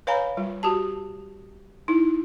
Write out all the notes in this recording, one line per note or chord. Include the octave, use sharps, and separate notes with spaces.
B4 C#5 F5 G#5 A#5 B5
G3 F4
F#4 G4 A5
D#4 E4